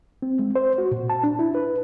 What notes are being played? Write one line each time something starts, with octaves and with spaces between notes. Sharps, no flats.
C4
G#3
C5
F#4
A#2
A5
D4
E4
B4